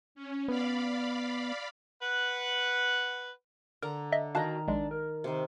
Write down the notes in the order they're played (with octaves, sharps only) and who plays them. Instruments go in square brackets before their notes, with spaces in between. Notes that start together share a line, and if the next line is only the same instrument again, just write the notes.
[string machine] C#4
[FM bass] B3 [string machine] D5 F5 B5
[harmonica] B4 F#5
[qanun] D3 A#5 [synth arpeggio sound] A#4
[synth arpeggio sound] D#5 E5
[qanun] D#3 A#5 [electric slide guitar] F#4 D#5 [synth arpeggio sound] F5 A5 F#6
[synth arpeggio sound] A#1 G#3 [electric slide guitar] D4
[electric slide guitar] A#4
[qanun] C3 D#3